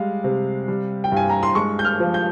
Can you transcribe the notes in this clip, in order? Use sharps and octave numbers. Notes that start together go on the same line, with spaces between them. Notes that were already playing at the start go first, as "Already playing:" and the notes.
Already playing: G3 G#3 F5
C3
G3
G5
G2 G#5
A#5
C6
G#3 C#6
G6
F6
F3
G6